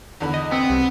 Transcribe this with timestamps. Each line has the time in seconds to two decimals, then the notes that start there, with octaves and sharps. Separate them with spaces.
0.20 E2 D3 B5
0.34 D#5
0.52 B3 C4
0.69 C2